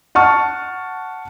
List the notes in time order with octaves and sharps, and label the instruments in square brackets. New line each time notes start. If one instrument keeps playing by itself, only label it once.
[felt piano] F#5 A5 C#6 F6